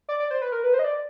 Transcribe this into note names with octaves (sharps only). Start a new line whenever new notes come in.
D5
D5
C5
B4
A#4
B4
C5
D#5
D5